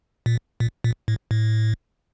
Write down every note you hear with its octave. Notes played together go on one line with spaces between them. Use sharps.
A#2
A#2
A#2
A2
A2